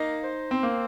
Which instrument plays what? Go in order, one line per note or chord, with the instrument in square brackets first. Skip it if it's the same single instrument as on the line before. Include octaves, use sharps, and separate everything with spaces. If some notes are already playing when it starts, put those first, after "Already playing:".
Already playing: [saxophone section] A#3 [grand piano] D#4
[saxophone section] C5
[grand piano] C4
[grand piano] A#3 [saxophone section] C4